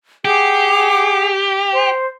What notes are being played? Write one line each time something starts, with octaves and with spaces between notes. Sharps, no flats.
G4 G#4 F#5 D6
C5